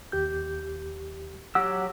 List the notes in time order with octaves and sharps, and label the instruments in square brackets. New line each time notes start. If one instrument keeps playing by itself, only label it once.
[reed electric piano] D#2 G4 G6
[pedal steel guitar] F#3 G4 E6 [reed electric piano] F#5